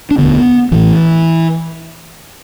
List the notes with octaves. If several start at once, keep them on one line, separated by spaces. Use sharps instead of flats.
D4
E1 D2 D3 B3
A1 A2 E3